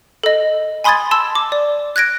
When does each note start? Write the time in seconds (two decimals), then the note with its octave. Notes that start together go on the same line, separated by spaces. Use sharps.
0.24 A4 D#5
0.84 G#5 B5 C6 D#6 G#6 A6
1.11 A5 C6 E6
1.35 D6
1.52 D5
1.96 F#6 G#6 A#6 D7